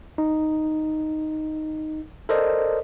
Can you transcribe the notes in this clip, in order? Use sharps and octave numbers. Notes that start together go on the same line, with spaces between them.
D#4
A4 A#4 C5 D5 D#5